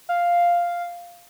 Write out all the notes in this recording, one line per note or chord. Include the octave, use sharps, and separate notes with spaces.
F5